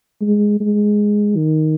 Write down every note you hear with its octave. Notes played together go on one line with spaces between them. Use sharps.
G#3
G#3
D#3